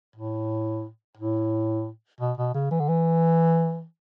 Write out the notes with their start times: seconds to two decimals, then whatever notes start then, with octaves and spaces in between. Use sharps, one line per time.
0.16 A2
1.18 A2
2.21 B2
2.37 B2
2.54 C#3
2.71 E3
2.80 D3
2.89 E3